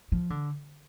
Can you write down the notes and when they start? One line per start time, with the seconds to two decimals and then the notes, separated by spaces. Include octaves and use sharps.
0.12 F3
0.30 D3